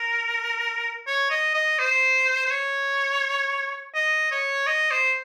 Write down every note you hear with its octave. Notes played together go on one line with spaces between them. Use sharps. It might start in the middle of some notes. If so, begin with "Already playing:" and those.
Already playing: A#4
C#5
D#5
D#5
C5
C5
C#5
D#5
C#5
D#5
C5